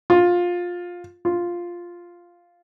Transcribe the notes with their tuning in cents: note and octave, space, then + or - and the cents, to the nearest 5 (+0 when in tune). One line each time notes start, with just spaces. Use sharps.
F4 +15
F4 +0